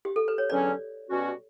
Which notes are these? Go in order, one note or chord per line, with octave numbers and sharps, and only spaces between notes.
G4
A4
B4
C#5
E2 D3 F#3 C#4 D5
B2 G3 C#4 F#4